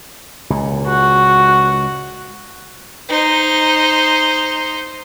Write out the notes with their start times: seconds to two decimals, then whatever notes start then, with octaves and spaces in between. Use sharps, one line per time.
0.50 C#2 A#2
0.89 F#4
3.09 D#4 C5